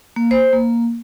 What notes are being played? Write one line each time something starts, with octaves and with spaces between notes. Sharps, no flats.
A#3
C5
A#3